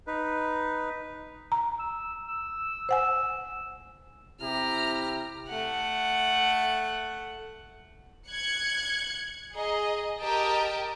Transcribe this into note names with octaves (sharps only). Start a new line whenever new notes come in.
D#4 B4
A#5
E6
E6
C5 F#5 G#5
C3 E4 G4 A#5 F6
A3 F#5
F#6 G#6 C#7
G#4 D#5 A#5
G4 A#4 D#5 G5 A5